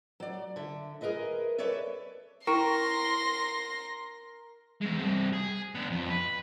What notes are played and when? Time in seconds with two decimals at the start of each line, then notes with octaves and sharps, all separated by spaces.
0.20 F#3 D5
0.56 D3 E5
1.01 G#4 A#4 B4 D#5 E5
1.58 A4 B4 C#5 D5 E5
2.47 E4 A#4 G5 C6 C#6 A#6
4.82 E2 G#3
4.98 G2 C4
5.33 G#4
5.75 B3 D4
5.90 F2
6.10 B4